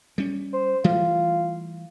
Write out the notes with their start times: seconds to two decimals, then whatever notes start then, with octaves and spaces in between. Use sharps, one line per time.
0.18 G3 C#4
0.53 C5
0.84 E3 G3 A3 F4